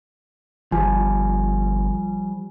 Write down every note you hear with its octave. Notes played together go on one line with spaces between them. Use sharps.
G1 F3 G3 G#5